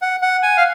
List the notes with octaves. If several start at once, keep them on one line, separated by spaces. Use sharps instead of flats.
F#5
F#5
G#5
F5